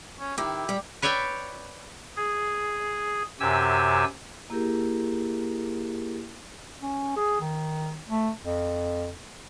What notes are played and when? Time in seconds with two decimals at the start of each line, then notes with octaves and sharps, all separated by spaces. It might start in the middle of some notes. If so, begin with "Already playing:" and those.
0.20 C#4
0.38 D#3 E4 G4
0.69 G3
1.02 B4 C#5 D5 E5 G5
2.16 G#4
3.40 F#2 C3 G4 G#5 E6
4.50 A#3 E4 G4 G#4 A#4
6.81 C#4
7.16 G#4
7.41 D#3
8.08 A3
8.44 F2